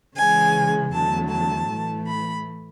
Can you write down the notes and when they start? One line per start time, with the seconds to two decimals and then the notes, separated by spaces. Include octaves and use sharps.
0.16 C#3 E3 G#3 G#5
0.92 E2 D3 F#3 A3 A5
1.30 A5
1.68 A2 E3 A3
2.06 B5